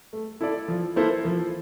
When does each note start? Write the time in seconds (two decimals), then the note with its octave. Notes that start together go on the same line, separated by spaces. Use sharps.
0.13 A3
0.41 E4 A4 D5
0.68 F3
0.96 A#3 E4 A4 C5
1.25 F3